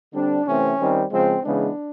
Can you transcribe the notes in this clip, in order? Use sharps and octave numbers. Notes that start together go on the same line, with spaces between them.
D3 G3 C4 D4
C3 E3 A3 C4 C#4
D#3 G3 C4
C#3 F3 G#3 C4
C#3 E3 G#3 B3 D4